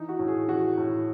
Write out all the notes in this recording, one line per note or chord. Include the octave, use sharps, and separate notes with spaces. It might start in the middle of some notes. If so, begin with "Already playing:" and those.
Already playing: E3 D#4
F#4
A2
G#4
E3 F#4
A2